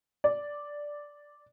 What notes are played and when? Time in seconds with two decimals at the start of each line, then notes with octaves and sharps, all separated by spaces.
0.24 D5